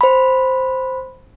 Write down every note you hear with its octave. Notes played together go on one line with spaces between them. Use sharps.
C5 B5